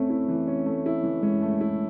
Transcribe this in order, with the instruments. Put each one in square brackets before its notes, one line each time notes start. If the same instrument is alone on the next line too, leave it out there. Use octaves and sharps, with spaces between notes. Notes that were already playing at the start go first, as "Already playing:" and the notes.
Already playing: [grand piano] A3 C#4 [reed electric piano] C4
[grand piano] E4
E3
C#4
A3
E4
E3
[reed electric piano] G#3 [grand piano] C#4
[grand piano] A3
E4